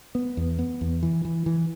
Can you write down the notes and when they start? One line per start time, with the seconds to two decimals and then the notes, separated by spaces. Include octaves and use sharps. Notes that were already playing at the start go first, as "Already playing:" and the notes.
0.15 B3
0.37 E2
0.59 B3
0.81 E2
1.03 E3
1.25 E3
1.46 E3